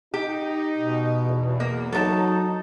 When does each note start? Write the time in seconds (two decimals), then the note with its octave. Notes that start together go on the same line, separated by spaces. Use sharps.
0.14 D#4 G4
0.77 B2
1.26 E2
1.60 A#3
1.92 F#3 D#4 A4 A#4 A5